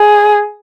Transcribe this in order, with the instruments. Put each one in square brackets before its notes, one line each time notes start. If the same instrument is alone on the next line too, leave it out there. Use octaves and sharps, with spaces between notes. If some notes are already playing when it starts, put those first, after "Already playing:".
Already playing: [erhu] G#4